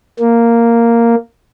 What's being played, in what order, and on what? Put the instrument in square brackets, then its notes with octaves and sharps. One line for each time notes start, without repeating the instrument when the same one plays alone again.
[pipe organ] A#3